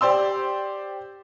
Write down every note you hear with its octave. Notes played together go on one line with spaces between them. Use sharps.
G4 C5 D5 C6 E6